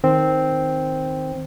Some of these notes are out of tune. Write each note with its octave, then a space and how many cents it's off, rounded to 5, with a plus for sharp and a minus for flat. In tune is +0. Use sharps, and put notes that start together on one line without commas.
D#3 +0 C4 +0